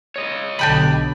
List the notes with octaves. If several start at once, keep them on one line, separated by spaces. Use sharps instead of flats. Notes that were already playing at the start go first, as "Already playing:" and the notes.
C#5 D#5
B1 D3 D4 G4 B5